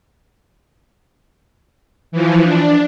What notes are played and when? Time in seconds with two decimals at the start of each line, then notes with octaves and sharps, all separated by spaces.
2.12 E3 F3
2.43 D4